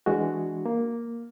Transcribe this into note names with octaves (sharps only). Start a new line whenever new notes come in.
E3 G#3 D4 F#4
A#3